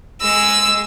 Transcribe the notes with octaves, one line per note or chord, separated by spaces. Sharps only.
G#3 E6